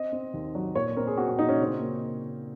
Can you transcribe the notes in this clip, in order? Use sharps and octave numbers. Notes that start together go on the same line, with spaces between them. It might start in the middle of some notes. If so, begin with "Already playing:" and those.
Already playing: C4 D#5
C4
D#2
F#3
A#2 C#5
C4 A#4
G#4
C4 F#4
F#4
A#2 D#4
C#4
C#3 C4
A#3